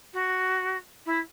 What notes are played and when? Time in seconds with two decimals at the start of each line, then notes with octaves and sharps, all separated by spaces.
0.13 F#4
1.05 E4